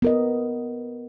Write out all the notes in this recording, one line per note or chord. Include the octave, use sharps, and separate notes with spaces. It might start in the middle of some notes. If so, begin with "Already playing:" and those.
B3 A#4 D#5